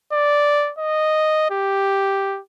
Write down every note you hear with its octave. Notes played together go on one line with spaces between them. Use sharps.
D5
D#5
G4